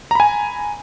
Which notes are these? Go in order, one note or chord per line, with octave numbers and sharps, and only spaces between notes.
G#5 A#5 B5